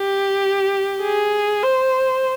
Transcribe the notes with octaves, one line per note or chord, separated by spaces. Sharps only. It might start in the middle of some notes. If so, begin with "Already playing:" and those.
Already playing: G4
G#4
C5